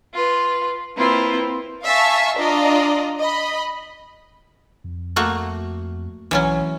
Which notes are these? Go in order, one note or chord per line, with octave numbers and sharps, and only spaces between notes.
F4 B4
A#3 C4 E4 F4 B4
E5 F5 G#5 A5 C#6
D4 F4 D5 D#5 A#5
D#5 B5
F2
A3 A#3 F#4
B1 E3 F#3 C#4